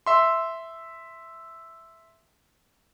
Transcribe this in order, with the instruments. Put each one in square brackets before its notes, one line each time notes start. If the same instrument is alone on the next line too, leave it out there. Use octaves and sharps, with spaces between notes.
[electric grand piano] E5 C6